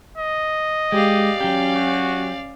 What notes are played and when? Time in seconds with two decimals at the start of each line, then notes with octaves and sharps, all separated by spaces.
0.18 D#5
0.92 G#3 G4 D5 F5
1.41 F#3 C#4 G4
1.75 F#4